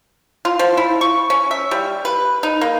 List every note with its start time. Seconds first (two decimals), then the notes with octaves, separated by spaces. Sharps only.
0.45 F4
0.59 F3
0.77 E4
1.01 C#6
1.30 C#4
1.51 E5
1.71 G3
2.05 B4
2.43 D#4
2.61 A#3